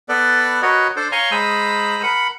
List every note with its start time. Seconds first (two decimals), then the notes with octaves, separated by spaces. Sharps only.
0.09 B3 A4 B4 D5
0.62 F#4 A#4 B4 C#5 D#5
0.96 D4 A4 C5
1.12 C#5 F5 G#5 A#5 C6 C#6
1.31 G#3 C5 A#5 B5 D#6 E6
2.03 A#4 F#5 B5